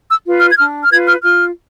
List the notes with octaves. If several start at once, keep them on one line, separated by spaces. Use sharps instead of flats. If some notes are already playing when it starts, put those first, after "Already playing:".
E6
F4 B4
F6
G#6
D4 F6
F6
F4 B4 G#6
F6
F4 F6